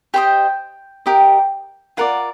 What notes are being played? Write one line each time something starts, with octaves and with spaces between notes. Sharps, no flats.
G4 C5 D#5 G5
G4 A#4 D#5
F4 A#4 D5 F#5